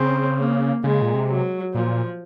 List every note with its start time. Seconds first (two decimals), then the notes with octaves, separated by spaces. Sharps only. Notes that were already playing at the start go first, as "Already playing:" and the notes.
Already playing: C#3 C4
0.38 A#3
0.84 C#3 G#3
1.02 A#2
1.14 C3
1.29 F#3
1.74 A#2 F3